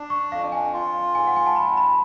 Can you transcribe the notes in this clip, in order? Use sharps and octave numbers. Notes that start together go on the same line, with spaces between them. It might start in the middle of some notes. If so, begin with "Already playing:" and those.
Already playing: D4
C#6
F2 F5
G#5
F4
G#2 G#5
F#5
G#5
A5
F2 B5
B5